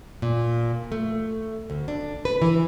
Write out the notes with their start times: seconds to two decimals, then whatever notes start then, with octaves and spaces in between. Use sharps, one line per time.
0.22 A#2
0.92 A3
1.70 D2
1.88 D4
2.25 B4
2.42 E3